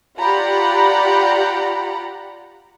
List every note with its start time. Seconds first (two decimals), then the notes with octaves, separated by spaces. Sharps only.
0.20 F4 G4 D5 F#5 A#5 B5